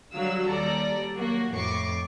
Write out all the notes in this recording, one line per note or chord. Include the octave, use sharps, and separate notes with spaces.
D3 F#3 G3 F5 E6
D#2 G3 A4 D5 A#5
F#3 A#3 F#4 A#4
F2 A2 C#6 D6 C7